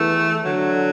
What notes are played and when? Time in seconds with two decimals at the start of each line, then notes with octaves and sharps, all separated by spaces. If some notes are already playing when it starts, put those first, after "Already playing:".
Already playing: E2 E3 A3
0.45 D3 F#3